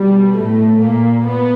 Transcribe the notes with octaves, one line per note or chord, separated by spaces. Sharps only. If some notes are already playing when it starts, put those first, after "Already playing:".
Already playing: B2 G3
A2 A3
A#2 A#3
B3